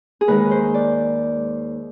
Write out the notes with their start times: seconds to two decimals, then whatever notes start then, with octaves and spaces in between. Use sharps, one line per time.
0.21 G#4
0.28 D#2 D#3 G#3 B4
0.51 C5
0.74 D5